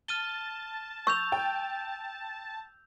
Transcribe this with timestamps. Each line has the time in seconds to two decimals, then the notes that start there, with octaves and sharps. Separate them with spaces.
0.08 A5 F6 D#7 G7
1.07 C#6 E6 G6 F7
1.32 G5